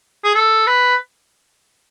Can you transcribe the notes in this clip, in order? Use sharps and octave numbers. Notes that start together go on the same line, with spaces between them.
G#4
A4
B4